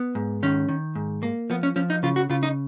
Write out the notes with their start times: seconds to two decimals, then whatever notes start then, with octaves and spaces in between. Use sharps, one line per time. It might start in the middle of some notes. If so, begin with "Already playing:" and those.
Already playing: B3
0.15 G#2
0.43 D#3 C#4
0.69 D#3
0.95 G#2
1.23 A#3
1.50 F3 B3
1.63 C#4
1.76 F3 C#4
1.90 D#4
2.03 C#3 F4
2.16 F#4
2.30 C#3 F4
2.43 D#4